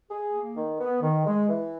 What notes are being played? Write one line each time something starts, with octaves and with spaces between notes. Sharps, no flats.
G#4
A#3
D#3
B3
D#3
G#3
E3